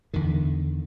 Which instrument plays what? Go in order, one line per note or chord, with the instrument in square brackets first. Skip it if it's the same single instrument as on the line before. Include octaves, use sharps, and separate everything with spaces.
[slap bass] E2 D3 D#3